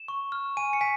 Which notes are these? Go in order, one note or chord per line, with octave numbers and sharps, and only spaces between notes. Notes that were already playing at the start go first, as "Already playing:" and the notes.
Already playing: E7
C#6
F6
G#5 D#7
C#7
G#5 B6